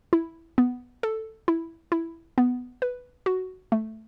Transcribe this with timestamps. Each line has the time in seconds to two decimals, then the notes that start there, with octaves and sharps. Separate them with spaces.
0.13 E4
0.58 B3
1.03 A4
1.48 E4
1.92 E4
2.38 B3
2.82 B4
3.26 F#4
3.72 A3